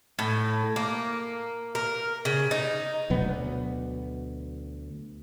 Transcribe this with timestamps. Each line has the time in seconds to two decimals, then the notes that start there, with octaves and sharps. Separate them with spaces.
0.19 A2
0.76 A#3
1.75 A#4
2.25 C#3
2.51 D#4
3.10 D2 B2 F#3 B3